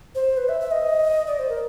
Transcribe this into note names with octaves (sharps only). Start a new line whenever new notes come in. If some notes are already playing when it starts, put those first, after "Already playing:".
C5
B4
E5
E5
D#5
D5
C5
A#4